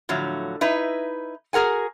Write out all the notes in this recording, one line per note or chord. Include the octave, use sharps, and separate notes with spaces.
A2 D3 F3 F#3
D#4 E4 B4
F#4 G#4 A#4 F#5 G#5